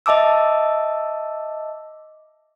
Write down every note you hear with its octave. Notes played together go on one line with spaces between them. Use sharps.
D#5 E5 A5 D6 E6